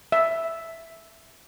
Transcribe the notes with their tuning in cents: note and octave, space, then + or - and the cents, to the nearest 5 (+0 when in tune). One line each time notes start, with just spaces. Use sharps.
E5 +0